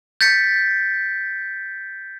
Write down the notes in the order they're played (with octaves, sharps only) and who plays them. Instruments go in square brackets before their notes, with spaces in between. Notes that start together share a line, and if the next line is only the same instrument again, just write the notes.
[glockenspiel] G6 A6 B6 C#7